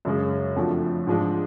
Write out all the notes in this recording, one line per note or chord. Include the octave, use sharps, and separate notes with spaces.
F#2 C#3 G#3
F2 F3 A3 D4 F#4
G#2 F3 G#3 D4 F4